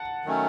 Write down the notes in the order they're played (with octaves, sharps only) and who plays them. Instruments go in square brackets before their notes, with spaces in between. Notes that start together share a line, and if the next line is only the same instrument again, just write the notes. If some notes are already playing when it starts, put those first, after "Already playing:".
Already playing: [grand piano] F#5 A5
[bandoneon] D#3 F#3 A3 C#4